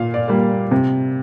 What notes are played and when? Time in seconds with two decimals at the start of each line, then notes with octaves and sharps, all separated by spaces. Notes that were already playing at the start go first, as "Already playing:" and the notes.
Already playing: A#2 F5
0.14 D5
0.28 G3 A#3
0.71 C3